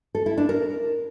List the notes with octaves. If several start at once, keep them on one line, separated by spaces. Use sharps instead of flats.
A4
E4
D4
A#4